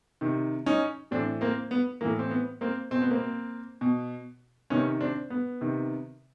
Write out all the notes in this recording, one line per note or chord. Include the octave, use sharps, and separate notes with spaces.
C3 D#3
C#4 D#4
A2 E3 C4 D4
A#3 C4
B3
A2 E3 A#3
C4
B3
A#3 C4
B2 C4
B3
A#3 C4
B2
C3 D#3 B3 C#4
C4 D4
B3
C3 D#3